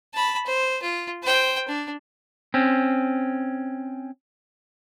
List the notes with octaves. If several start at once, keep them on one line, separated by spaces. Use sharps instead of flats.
A5 B5
C5
F4
C5 G5
D4
C4 C#4